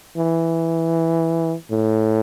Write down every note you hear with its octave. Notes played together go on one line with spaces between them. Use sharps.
E3
A2